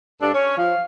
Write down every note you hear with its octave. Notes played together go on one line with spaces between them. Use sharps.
G2 D4 A4
C#4 C#5
F3 F5